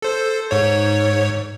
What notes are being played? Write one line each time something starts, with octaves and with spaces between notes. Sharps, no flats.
A4 C5
G#2 C#5